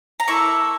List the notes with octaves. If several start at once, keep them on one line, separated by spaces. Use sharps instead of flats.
A#5
A#3 E4 A4 C#6